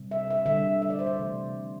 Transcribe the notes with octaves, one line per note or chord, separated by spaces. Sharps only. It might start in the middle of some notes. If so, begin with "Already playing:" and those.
Already playing: C3 G3
E5
E5
D3 G3 E5
E5
D5
C5
D5
C3 E3 A3